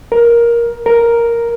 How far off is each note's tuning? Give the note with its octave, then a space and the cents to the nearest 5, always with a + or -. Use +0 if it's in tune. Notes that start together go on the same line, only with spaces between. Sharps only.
A#4 +10
A#4 +0